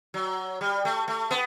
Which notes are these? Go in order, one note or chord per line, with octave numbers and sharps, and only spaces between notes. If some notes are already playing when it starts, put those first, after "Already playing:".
F#3
G3
A3
A3
B3